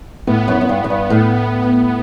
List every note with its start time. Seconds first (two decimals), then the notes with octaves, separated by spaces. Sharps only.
0.27 A2 B3
0.48 F#2
0.61 F#2
0.69 G2
0.84 F#2
0.90 G2
1.10 A2